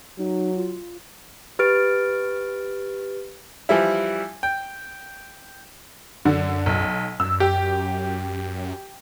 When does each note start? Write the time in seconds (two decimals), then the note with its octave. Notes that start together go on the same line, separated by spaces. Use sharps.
0.19 F#3 D#4
0.57 F4
1.59 G4 B4 F6 A6 D7
3.69 E3 F3 G3 E4
4.43 G5
6.25 F#2 D3
6.66 B1
7.20 F#2 E6
7.40 G4